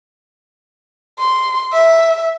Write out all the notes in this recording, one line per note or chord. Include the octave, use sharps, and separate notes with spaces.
C6
E5